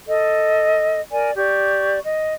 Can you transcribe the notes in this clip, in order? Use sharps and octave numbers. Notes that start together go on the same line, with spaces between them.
A4 D#5
A#4 D5 G#5
G4 D5 C#6
D#5